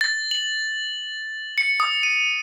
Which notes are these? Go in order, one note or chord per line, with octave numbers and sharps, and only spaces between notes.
A6
F#7
C#7
D#6
D#7